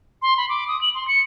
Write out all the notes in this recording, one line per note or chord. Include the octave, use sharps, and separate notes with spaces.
C6
B5
D6
D#6
F#7
C6
C#7